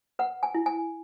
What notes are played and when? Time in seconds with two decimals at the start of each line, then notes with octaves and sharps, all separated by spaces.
0.19 B4 F#5
0.43 G#5
0.54 E4
0.66 G#5